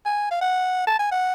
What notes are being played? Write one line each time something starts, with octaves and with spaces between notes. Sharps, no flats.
G#5
F5
F#5
A5
G#5
F#5